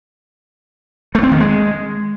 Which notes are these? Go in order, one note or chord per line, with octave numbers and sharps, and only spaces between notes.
A3
C4
D#3
G#3